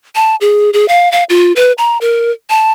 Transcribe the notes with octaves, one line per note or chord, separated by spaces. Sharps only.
A5
G#4
G#4
F5
F5
F4
B4
A#5
A#4
A5